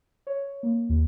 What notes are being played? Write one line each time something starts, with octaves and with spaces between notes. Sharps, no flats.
C#5
A#3
D#2